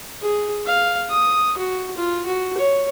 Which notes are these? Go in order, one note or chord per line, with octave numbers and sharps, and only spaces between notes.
G#4
F5
D#6
F#4
F4
F#4
C#5